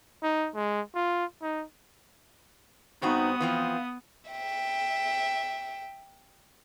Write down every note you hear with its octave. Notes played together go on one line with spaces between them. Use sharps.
D#4
G#3
F4
D#4
G2 B3 C4 D#4 F#4 D#6
E3 F3 C4 F5
E5 G5